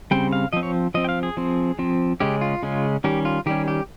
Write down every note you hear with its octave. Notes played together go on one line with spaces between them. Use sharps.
C#3 G3 C4 G5
F5
F3 C4 D#5
C#5
F3 C4 D#5
G5
F5
G#4
F3 C4
F3 C4
C#3 G#3 C#4 G4
F4
C#3 G#3 C#4
D#3 G3 C#4 G4
F4
D#3 G3 C#4 G4
G4